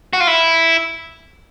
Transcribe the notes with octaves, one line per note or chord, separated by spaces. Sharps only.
F#4
F4
E4